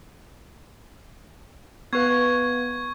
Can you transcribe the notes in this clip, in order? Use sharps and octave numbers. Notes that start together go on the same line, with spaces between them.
B3 B4 F5 C#6 G#6